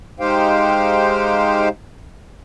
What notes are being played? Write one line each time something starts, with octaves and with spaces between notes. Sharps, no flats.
G#3 D#4 G4 C5 F5 G5